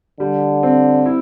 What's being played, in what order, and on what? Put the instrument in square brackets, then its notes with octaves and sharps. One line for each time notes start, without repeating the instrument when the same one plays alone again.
[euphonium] D3 [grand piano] G3
[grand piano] C4
E4